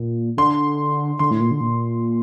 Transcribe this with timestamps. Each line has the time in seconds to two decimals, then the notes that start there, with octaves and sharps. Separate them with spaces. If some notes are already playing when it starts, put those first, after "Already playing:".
Already playing: A#2
0.37 D3 C6
1.19 D3 C6
1.31 A2
1.40 A#2
1.51 D3
1.61 A#2